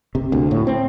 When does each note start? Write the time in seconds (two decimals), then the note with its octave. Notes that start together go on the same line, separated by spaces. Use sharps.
0.15 C3
0.32 D2
0.51 A2
0.67 C4